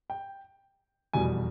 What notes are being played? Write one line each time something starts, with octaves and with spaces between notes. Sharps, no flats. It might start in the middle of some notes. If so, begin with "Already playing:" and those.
G5
F1 E2 B2 G3 G#5